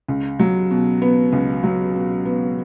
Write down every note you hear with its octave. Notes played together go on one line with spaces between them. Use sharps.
C#2
F#3
B2
B3
C#2
F#3
B2
B3